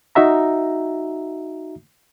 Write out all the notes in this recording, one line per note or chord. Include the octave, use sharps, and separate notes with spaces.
D#4 F#4 E5 A#5